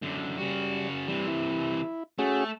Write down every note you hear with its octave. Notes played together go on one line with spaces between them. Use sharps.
F#2 D3
C#3 G3 F#4
C3 E3 G3
E4
A3 C#4 F#4 G#4